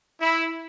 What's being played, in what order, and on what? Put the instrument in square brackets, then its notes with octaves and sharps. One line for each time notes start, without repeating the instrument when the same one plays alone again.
[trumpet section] E4